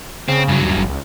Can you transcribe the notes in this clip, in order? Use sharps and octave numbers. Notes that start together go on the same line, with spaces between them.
C#3 C4
G2 F#3
D#2
G#1
C#2